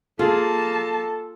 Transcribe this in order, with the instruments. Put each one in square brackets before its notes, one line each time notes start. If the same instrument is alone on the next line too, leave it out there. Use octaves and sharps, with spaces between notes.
[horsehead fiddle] A#3 A5 [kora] F4 [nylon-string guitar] G#4 [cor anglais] A4